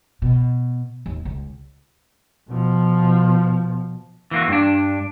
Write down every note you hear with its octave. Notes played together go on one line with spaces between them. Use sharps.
B2
D#2
C#2
B2 F3
E3 A#3 F#4
G2 D4